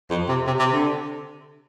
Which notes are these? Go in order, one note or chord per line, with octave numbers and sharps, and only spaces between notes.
F2
C3
C3
C3
D3